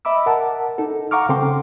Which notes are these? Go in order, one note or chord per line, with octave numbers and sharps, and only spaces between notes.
D#5 E5 B5 D6 E6
A#4 F#5 A5
D#4 A4
F5 F#5 A#5 C#6 D6 F6
C#3 C4 A4 G5 C6 D6